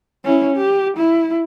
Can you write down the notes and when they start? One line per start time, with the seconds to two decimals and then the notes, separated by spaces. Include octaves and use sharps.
0.25 C#4 E4
0.57 G4
0.97 E4